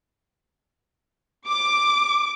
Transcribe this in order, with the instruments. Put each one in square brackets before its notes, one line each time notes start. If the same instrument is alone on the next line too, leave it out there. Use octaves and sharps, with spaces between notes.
[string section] D6